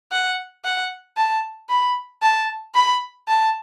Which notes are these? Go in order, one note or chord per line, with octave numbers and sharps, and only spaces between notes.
F#5
F#5
A5
B5
A5
B5
A5